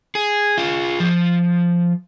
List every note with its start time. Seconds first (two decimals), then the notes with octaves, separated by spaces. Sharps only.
0.15 G#4
0.58 F4
1.00 F3